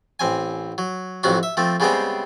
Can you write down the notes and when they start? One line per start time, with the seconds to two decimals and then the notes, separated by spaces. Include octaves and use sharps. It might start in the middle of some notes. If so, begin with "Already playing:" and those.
0.19 A1 C4 G#5
0.78 F#3
1.23 A1 F2 C3 F#3 F#4
1.43 E5
1.57 F3 A3 C4
1.80 C#3 G3 G#3 B3 C4 G4